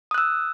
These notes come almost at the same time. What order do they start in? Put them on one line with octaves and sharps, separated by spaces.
D#6 F#6 E6